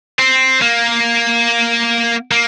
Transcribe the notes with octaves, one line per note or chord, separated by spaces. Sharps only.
C4
A#3
A#3